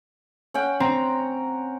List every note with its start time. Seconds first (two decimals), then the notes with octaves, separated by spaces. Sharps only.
0.54 C#4 F#5 G5
0.80 C4 A#5